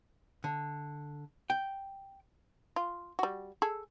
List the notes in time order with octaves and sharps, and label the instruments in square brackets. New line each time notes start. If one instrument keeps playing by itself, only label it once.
[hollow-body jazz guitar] D3
G5
[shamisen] F4
G3 F#4
G#4 A4